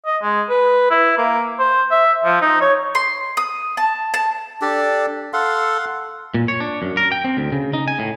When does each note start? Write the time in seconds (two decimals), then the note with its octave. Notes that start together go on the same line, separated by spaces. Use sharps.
0.06 D#5
0.22 G#3
0.49 B4
0.90 E4
1.18 A#3
1.59 C5
1.91 E5
2.24 F3
2.41 D#4
2.61 C#5
2.95 C6
3.37 D#6
3.77 A5
4.14 A5
4.61 D4 G4 A4 D5
5.33 A4 F5 F#5 C6
6.34 A#2
6.48 C#5
6.60 D4
6.82 F#2
6.97 A#4
7.12 G5
7.24 C4
7.37 D2
7.52 C#3
7.73 D#4
7.88 G#5
7.99 A2